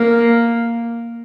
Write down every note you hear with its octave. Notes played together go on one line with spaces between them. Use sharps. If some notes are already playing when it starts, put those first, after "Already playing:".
Already playing: A#3